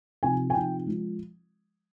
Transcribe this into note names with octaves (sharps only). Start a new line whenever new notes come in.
C3 F3 C4 D#4 G#5
G#5
C3 F3 C4 D#4 G5
F3 G#3